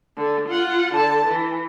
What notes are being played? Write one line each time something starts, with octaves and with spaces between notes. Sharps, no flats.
D3
F4 F#5
D3 A5
E3